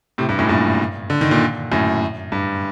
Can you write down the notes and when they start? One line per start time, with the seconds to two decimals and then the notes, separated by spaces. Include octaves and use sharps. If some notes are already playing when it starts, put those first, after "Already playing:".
0.18 A2 C3
0.29 G2
0.39 F#2 A2
0.49 G2 A#2
1.10 D3
1.21 D#3
1.31 A#2 D3
1.71 F#2 A2
2.32 G2